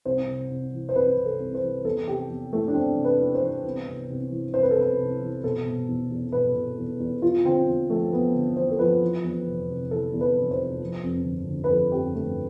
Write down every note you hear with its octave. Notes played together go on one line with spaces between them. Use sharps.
C2 C5
C3
C2
E3
C5
C2 B4
C3
A4
C2
C5
E3
E2 A4
C3 G4
E2
E3 A3
D4
E2 C4
C3
B4
E2
C5
E3
C2
C3
C2
E3
C2 C5
B4
A4
C3 B4
C2
E3
B2 A4
B2
E2
E2
B2 B4
B2
E2
E2
E2 F4
D3 C4
E2
F3 A3
E2 B3
D3
E2 C5
A4
F3 B4
E3
E2
F1
C3
E3 A4
E2
B4
F1
C5
C3
F3
F2
G1
D3
B4
F3 A4
F2 G4
G1 A3